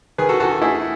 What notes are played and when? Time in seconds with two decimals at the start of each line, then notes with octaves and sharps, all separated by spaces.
0.18 D#3 G#4 B4
0.29 F#4 A4
0.40 E2 F#4 A4
0.62 A3 E4 G#4